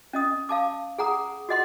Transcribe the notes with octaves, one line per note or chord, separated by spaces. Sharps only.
C#4 D#5 D#6
F5 A5 D6
G#4 F#5 A#5 D#6
F#4 G#4 D#5 F#5 C6